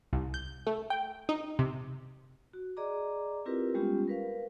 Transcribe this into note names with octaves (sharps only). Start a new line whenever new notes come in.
C2
G6
A3
G5
D#4
C3
F#4
G#4 D5 D#5 A#5 D6
C4 E4 F4 G4 A#4 B4
G3 G#3 B3 C#4 F4 G4
A#4 B4 F5